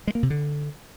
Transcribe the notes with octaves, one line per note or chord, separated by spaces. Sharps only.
G#3
A#3
C3
D3